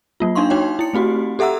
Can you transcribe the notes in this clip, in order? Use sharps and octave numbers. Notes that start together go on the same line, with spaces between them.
F#3 A#3 F4
D4 D#4 F5 C6 C#6
D#4 F#4 C#5 G5
E4 C#7
A3 C4 F#4 G4
G4 A4 E5 F#5 A#5 E6